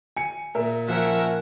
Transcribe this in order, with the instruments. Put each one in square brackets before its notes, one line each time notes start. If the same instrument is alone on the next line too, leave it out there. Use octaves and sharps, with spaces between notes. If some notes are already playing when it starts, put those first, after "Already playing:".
[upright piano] G#5 C#7
[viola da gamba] A#2 [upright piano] A#4 E5
[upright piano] F3 [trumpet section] C#4 E5 [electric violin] A#4 F#5